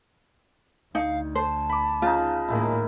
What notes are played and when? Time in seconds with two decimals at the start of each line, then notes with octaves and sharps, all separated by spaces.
0.95 D2 D#4 F5
1.35 C5 A5
1.69 B5 D6
2.02 C#3 D#4 F4
2.48 A2 D#3 G#3 A#3 E4